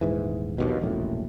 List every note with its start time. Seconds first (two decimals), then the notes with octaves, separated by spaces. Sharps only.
0.01 D#1 G#2 E3
0.58 A#1 D#2 B2
0.81 E1 A#1 F#2 A2